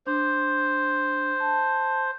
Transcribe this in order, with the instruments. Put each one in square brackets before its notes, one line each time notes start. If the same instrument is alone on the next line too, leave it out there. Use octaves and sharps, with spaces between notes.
[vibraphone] D4 [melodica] C5
[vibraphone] A5